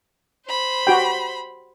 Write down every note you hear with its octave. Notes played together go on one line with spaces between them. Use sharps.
C5 B5
F#4 G4 G5